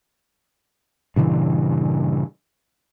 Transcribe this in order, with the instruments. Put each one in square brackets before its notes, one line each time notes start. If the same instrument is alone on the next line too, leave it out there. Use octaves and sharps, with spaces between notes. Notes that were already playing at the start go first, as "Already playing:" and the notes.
[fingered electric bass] G2 A#2 C#3 E3